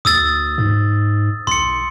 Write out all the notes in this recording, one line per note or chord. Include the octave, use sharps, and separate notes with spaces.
D2 D#6 E6 A6
G#2
B1 C6 C#7